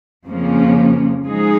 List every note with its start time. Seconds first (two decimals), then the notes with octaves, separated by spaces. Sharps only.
0.25 F2 C#3 F3 A#3 C#4
1.26 F3 G#3 D#4 G#4